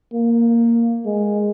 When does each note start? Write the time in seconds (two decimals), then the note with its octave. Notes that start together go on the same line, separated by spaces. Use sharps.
0.14 A#3
1.05 G#3